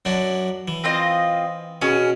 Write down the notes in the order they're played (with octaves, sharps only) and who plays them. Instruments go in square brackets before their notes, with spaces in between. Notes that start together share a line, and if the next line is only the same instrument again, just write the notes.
[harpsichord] F#2 F#3 D4
E3
[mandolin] C4 F4 D#5
[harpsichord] B2 [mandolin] C#4 G#4